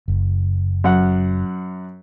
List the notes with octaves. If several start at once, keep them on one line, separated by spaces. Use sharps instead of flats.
F#1
F#2 F#5